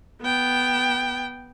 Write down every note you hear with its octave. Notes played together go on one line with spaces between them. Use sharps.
B3 G5